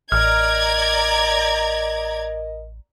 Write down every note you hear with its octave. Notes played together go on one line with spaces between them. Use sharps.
A1 A#4 D5 D#5 A#5 F6 G#6